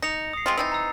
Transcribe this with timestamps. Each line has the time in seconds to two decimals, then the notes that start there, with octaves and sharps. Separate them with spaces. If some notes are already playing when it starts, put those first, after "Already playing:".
0.02 D#4 A#6 C#7 F7
0.33 D#6 C7
0.46 G#3 C4 F4
0.57 E3 C4 D#4 E6 A6
0.72 A#5 E6